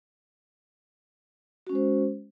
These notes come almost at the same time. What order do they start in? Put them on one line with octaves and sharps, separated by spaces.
F#4 C#4 G#3 C5